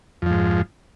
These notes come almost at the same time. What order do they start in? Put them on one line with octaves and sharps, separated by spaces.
F2 F3 G#2